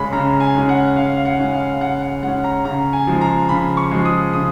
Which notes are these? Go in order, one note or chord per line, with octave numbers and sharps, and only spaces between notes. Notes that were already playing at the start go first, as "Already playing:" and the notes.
Already playing: C#3 G#3 C#4 B5
C#3 A#5
A#5
G#5
G#3 C#4
F#5
C#3 F5
F5
F#5
G#3 C#4
F5
C#3 F#5
F#5
G#3 C#4 F#5
A#5
C#3 A#5
G#5
F3 G#3
A#5
C#3 B5
C#6
F3 G#3
D#6
C#3 D#6